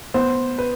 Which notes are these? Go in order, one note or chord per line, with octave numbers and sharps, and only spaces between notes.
B3 C5
B4